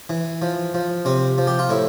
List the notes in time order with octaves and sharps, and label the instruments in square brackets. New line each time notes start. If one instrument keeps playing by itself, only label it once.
[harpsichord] E3
F3
F3
C3 C4
F3
G4
F4
A2 E4